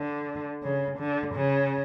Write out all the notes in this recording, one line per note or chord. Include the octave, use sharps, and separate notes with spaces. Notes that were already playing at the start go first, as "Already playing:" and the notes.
Already playing: D3
C#3
D3
C#3